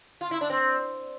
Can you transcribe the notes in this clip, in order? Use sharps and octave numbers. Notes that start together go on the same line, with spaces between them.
F4
E4
D4
C4